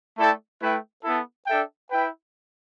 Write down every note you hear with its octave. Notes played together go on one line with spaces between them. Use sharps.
A3 E4 A4 D5 G5
A3 E4 B4 E5 G5
B3 E4 A4
D4 A4 E5 G5
E4 B4 G5